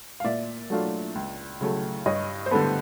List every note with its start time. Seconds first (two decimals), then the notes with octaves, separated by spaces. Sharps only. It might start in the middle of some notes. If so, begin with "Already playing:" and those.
0.20 F5
0.25 A#2 D5 E5
0.70 F#3 A3 D4 F4
1.15 C#2
1.61 C#3 F#3 A3
2.06 G2 C#5 D#5
2.46 C5
2.51 D3 G3 B3 A4 B4